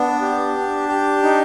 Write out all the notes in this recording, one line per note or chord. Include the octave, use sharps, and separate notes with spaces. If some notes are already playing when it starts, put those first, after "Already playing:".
Already playing: B3 D4
G4
D4
G4
D#4